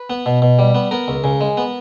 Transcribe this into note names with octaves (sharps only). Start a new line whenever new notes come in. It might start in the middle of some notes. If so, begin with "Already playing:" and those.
Already playing: B4
B3
B2
B2
G3
B3
B3 A#4
C#2
C#3
G#3
B3